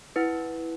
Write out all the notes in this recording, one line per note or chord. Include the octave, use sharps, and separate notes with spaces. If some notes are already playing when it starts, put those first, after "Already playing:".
E4 B4 F#5